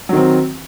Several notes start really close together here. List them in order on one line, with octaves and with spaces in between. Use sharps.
F#3 D#3 C4